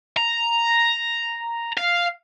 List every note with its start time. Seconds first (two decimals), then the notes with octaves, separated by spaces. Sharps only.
0.17 A#5
1.78 F5